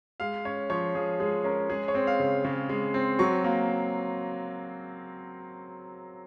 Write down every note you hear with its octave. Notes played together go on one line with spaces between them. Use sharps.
G#3 F5
C#4 C#5
F3 C#5
F3 G#4
G#3 G#4
C#4 A#4
G#3 G#4
C#5
C4
F5
C#3
C#3
G#3
C4
F#3 C#6
A#3